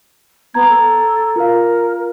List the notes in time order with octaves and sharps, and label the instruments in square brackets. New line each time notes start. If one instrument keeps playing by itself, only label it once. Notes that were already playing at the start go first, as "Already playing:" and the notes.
[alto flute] B3 [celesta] A#5 G#6
[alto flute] A4
[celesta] F4 F5 [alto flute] A#4